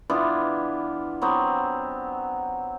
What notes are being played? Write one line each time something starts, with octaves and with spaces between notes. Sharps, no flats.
E3 B3 D4 F4
F#3 B3 C4